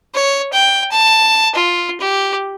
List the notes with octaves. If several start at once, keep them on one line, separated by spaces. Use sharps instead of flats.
C#5
G5
A5
F4
G4